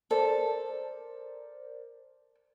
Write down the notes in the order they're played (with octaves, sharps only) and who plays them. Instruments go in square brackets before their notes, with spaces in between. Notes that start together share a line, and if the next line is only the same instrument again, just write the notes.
[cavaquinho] A4 [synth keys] A#4 C5 D5